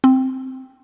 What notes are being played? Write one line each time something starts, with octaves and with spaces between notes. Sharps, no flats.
C4